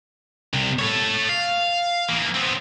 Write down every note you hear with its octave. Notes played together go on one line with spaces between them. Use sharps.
C2 C3
A4 C#5
F5
E3 A#3
B3 C4